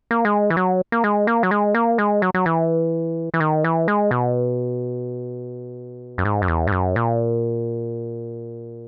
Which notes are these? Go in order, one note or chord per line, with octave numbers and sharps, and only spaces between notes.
A#3
G#3
E3
F#3
A#3
G#3
A#3
F#3
G#3
A#3
G#3
F#3
F#3
E3
E3
D#3
E3
G#3
B2
F#2
G#2
F#2
E2
G#2
F#2
A#2